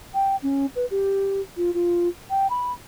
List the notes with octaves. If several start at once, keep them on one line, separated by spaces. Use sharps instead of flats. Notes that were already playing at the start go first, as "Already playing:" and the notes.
G5
C#4
B4
G4
F4
F4
G5
B5